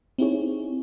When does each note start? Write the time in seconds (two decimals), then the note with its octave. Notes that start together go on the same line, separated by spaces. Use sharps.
0.18 C4 D#4 E4 G4 G#4 C#5